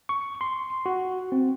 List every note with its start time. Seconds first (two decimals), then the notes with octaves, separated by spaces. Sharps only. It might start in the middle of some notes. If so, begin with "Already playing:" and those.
0.09 C#6
0.41 C6
0.86 F#4
1.32 C4